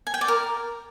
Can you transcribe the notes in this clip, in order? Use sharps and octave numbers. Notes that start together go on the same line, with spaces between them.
G#5
G5
D5
A#4